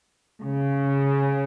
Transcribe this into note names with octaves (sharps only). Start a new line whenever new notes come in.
C#3